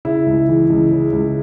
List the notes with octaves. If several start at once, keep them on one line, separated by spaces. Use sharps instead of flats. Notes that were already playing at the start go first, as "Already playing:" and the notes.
C#3 E4
C#2
E3
C#2
C#3
C#2